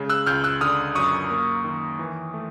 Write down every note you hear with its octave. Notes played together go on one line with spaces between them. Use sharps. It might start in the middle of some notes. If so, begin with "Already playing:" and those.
Already playing: C#3 G#3
E6 F#6
C#2 F6 G6
E6 F#6
D3 D#6 F6
F#2 C#6 D#6
A#3
D#3
E3
A3